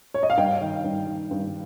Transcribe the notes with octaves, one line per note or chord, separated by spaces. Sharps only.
C#5
D#5
F5
G2 G5
D#3
G2
D#3
G2